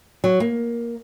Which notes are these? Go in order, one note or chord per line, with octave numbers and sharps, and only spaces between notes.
F#3
A#3